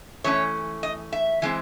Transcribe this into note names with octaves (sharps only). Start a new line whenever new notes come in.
E3 A3 C#4 C#5
D#5
E5
E3 G#3 C4